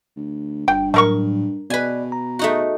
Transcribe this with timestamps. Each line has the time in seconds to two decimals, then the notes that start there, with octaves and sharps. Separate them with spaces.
0.16 D2
0.68 G1 G2 G5
0.94 A2 F#3 A3 A#4 C#6
1.70 B2 B4 D5 D#5 G#5
2.12 A#5
2.39 A3 D#4 F#4